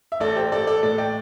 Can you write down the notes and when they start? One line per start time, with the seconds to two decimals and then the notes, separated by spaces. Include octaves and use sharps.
0.12 E5
0.20 A1 A4 D5
0.36 G4 C5
0.52 A1 A4 D5
0.67 A4 D5
0.83 A2 A4 D5
0.98 D5 G5